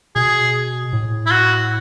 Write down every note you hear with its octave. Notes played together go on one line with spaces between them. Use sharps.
B2 G#4
A2
E4
F#4